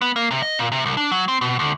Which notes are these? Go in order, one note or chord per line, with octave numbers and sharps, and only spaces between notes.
B3
A#3
C3
D#5
A#2
C3
C2
D4
F#3
C4
B2
D2